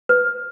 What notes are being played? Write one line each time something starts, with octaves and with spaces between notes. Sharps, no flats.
B4